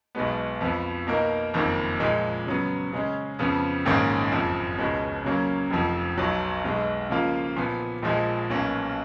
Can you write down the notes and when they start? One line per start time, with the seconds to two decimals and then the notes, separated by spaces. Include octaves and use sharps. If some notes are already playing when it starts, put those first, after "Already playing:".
0.15 B1 B2 G#3 B3
0.61 F2 F3 B3
1.07 B2 A#3 D#4 A#4
1.54 F#1 F2 D#3 A#3
2.00 A#2 F3 G#3
2.46 C#3 F#3 B3
2.93 C#3 G#3 C#4
3.39 F2 C#3 F3 B3
3.85 A#1 G#2 D#3 A#3 C#4
4.32 F#1 F2 F3
4.78 C#2 B2 G#3 C#4
5.24 C#3 F#3 A#3 C#4
5.71 F1 F2 F3
6.17 B1 B2 F#3
6.64 B1 B2 G#3
7.10 C#3 F3 A#3 F4
7.56 A#2 F3 B3
8.02 A#1 A#2 F3 G#3
8.50 B1 B2 A#3 C#4